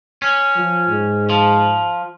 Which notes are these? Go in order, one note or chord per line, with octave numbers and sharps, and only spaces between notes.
C#4
F3
G#2
F3